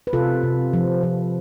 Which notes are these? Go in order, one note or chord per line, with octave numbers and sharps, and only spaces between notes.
B4
C3 F4 A4
C3
F3
F3